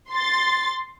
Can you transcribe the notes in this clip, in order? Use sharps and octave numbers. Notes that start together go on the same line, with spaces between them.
C6 A6